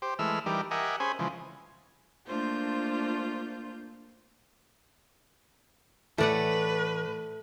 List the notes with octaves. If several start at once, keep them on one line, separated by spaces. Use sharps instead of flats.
G4 C5
E3 G#3 A3 E6 F6
E3 G3 D#4 G4 A#4
G4 A#4 D#5 E5 F#5 G#5
C#4 G#4 C5 G#5 B5
C#3 E3 F3 G#3
A3 A#3 D4 F4 C5 G6
A2 E3 A3 B4 D5 F#5